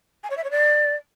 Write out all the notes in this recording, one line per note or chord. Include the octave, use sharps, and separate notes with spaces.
G#5
C#5
E5
C#5
D5